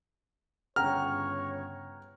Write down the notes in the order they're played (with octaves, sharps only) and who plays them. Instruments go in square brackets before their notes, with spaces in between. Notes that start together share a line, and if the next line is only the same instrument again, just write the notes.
[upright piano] G1 C#3 [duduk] C#5 [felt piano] F#5 G5 A#5 [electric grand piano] F6